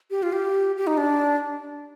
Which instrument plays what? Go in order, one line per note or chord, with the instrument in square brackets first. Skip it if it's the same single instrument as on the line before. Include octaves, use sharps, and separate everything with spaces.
[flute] G4
F4
G4
G4
D#4
D4